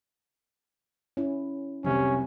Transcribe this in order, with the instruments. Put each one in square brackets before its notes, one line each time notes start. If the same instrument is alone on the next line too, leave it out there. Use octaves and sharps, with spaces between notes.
[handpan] C#4 E4
[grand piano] F1 C2 C3 [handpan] F#3 [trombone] C#4